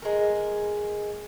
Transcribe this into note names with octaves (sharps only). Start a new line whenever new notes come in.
G#3 A#4